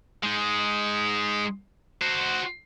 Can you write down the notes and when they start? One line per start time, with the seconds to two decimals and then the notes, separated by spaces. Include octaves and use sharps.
0.23 G#3 D#4
2.02 F#4 C5